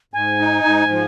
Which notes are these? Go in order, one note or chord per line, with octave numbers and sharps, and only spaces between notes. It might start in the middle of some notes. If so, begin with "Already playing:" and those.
G#2 G#5
D#4
G#2
F3